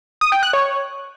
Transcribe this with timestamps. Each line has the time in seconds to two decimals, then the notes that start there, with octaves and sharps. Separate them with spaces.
0.21 D#6
0.32 G5
0.43 F#6
0.53 C#5